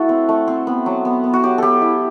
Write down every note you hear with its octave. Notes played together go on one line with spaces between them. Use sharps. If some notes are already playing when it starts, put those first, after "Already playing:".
Already playing: A3 E4 F#4 A4
C4
A3
C4
B3
F#3
B3
B3
F#4
F#3 G4
B3 G4 A4
E4